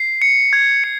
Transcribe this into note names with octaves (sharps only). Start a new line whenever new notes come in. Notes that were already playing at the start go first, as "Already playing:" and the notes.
Already playing: C7
C#7
G#6
C#7